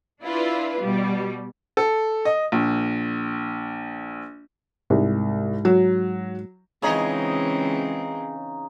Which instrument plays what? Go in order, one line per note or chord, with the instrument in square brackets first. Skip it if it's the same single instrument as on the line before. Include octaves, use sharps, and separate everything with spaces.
[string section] D4 E4 F4 B4
B2 G3
[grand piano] A4
D#5
A#1
[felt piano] C2 [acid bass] G#2
[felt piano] F#3
[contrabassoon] C#2 [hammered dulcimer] C#3 D#4 [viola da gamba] E3 C4 [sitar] G#4 C#5 D#5